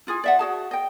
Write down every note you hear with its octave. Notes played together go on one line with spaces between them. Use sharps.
E4 F4 G#4 G#5
D5 E5 F#5
F#4 G#4 A5
D#5 G5